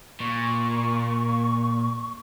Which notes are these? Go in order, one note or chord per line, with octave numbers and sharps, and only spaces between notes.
A#2 C#6